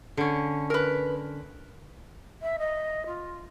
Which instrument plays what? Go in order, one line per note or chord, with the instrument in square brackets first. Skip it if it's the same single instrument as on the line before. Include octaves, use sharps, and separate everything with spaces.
[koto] D3 C#4
[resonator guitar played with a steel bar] A#4 B4
[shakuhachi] E5
D#5
F4